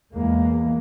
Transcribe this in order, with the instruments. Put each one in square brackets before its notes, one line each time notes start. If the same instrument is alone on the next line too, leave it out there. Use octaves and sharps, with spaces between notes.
[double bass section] E2 G#3 A#3